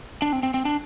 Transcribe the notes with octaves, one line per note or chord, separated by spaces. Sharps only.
D4
C4
C4
C4
D4